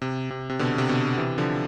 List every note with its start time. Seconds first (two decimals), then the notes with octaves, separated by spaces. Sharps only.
0.02 C3
0.30 C3
0.50 C3
0.59 B2 D3
0.78 C3
0.89 B2 D3
1.17 C3 E3
1.38 D3 F3